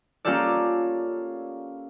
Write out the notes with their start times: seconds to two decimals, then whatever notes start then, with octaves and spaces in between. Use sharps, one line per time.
0.25 A#3 C#4 F4 G4 A4 D5